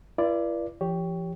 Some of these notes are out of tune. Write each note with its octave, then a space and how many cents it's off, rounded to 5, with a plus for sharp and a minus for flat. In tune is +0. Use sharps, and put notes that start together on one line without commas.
E4 +45 B4 -35 D5 +0
F3 -35 G4 +0 C#5 +10